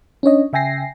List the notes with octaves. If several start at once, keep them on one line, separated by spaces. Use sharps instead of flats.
C#4 D4 C#5 D#5
C#3 E5 G5 G#5 A#6 C7